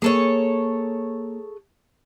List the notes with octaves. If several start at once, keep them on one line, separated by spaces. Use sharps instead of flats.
A#3 G#4 A4 C#5